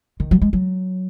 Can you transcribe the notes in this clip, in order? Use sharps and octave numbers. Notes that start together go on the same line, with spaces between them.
D#3
F#3
G#3
F#3